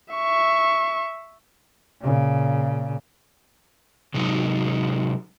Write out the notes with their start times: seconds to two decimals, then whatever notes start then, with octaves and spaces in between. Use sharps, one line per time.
0.14 E5 C#6
2.01 A#2 C#3
4.14 C3 F#3 G#3 D#4